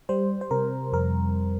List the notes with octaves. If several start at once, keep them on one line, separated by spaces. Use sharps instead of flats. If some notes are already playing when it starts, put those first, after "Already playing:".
G3 C5
C5
C3 A#4
F2 A#4